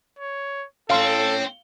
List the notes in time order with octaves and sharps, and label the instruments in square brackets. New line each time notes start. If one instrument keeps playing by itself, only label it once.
[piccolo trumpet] C#5
[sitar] A2 C#4 [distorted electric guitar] C4 [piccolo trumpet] A4 [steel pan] F5 C6